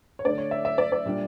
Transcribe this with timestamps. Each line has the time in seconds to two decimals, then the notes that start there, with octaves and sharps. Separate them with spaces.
0.19 C#5
0.25 D3 A3 D4 D5
0.38 C#5
0.51 E5
0.65 E5
0.78 D5
0.92 D5
1.06 A#2 G3 D4